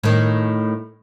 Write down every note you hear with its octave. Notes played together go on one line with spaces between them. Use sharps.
A2 D#3